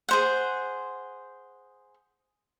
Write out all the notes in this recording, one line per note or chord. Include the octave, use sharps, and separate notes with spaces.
G#4 C5 F#5